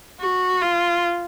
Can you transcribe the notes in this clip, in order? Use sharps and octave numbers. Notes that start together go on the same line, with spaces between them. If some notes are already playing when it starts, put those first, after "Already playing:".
F#4
F4